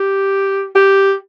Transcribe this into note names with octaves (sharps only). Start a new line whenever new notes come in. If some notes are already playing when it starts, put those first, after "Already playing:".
Already playing: G4
G4